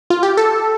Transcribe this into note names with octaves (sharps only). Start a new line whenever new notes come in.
F4
G4
A4